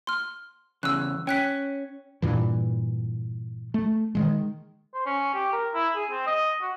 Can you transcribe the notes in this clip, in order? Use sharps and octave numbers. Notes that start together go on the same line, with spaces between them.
C6 F6
E2 C#3 E6 F#6
C#4 G5 F#6 B6
G2 A#2 E3
A3
D#3 E3 G#3
C5
C#4
G4
A#4
E4
G#4
C4
D#5
F#4